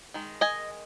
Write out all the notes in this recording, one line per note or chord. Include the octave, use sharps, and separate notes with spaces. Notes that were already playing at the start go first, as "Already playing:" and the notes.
D#3 G#3
D#5 G#5